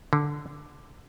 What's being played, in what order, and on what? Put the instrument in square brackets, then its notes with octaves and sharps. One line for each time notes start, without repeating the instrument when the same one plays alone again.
[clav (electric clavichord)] D3